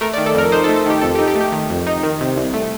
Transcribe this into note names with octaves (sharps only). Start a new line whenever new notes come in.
A3 A#4
D5
D#3
A4
F2 A#4
D#4 C5
A4
A3
A4
D#3 G4
F2 A4
G4
D#4
G4
A3
G4
D#3
F2
D#4
D#3
C3
C2
A3